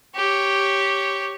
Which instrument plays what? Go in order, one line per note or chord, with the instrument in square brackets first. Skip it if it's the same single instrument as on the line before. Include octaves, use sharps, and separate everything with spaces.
[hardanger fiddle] G4 C#5